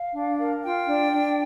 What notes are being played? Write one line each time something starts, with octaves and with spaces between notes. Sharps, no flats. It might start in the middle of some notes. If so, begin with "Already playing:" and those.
Already playing: F5
D4
A#4
F4 G5
D4
D4